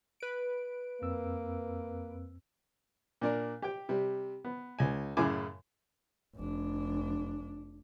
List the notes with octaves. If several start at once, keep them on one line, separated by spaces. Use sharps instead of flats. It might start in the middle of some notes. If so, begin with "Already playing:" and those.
B4 D7
F2 A#3 C4 E6
A#2 D4 A#4
G4 G5
C3 G3
B3
C#2 G#5
F#2 A2 C#3 E4 G#5 D6
F1 D4